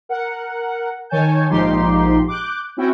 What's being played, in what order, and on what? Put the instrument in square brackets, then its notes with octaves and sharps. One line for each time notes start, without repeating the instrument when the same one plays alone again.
[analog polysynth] A#4 F#5
D#3 C#5 G#5 A5 G6
A#1 G#2 F3 D#4 G4 C6
D6 F#6 G6
C4 C#4 E4 F#4 G5